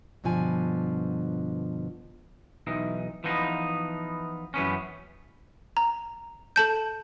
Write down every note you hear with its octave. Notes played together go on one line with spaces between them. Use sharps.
G2 B2 D3 F3 G#5
B1 E3 D#4
E3 F3 B3 D#4
F#2 E3 B3 C#4
A#5
A4 A5 G6